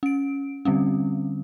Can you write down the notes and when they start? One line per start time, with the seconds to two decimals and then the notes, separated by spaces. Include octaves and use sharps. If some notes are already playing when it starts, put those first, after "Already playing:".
0.03 C#4 D7
0.65 D3 G3 C4 C#4